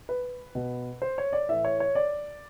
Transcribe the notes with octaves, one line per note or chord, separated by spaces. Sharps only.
B4
B2
C5
C#5
D5
A2 E3 E5
C#5
C#5
D5